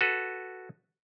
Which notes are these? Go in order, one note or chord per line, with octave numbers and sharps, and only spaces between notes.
F#4 A4 B4